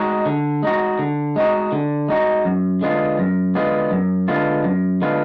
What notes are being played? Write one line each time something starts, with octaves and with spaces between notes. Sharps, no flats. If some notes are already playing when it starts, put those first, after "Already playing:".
Already playing: G#3 D#4 F#4
D3
G#3 D#4 F#4
D3
G#3 D#4 F#4
D3
G#3 D#4 F#4
F#2
D3 G#3 B3 F4
F#2
D3 G#3 B3 F4
F#2
D3 G#3 B3 F4
F#2
D3 G#3 B3 F4